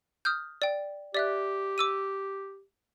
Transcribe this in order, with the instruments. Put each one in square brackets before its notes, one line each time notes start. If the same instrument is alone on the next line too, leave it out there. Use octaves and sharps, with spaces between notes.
[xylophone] D#6 F6 G6
D5 G5
[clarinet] G4 [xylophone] D5 E5 F#6
[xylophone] D6 E6 D#7